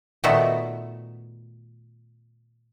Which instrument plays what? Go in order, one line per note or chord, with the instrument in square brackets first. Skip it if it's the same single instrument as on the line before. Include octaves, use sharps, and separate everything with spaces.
[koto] A#2 D#3 A3 B3 F#4 E5